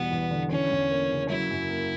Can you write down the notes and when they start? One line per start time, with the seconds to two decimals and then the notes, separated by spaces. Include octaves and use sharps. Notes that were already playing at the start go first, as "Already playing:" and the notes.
Already playing: E2 B2 G3 B3
0.11 E2
0.31 D3
0.51 E3 C#4
0.71 E2
0.91 A#3
1.11 C#3
1.30 F#3 E4
1.51 F#2
1.69 A#3